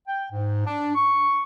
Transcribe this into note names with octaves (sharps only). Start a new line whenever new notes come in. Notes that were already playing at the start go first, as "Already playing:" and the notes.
G5
G#2
D4
C#6